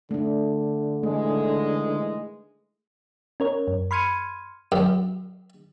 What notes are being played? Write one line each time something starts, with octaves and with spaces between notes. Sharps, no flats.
D3 A3 D4
D#3 E3 G#3 A3
C#4 A#4 C#5
F#2
B5 C6 F6 G#6 C#7 D#7
F#2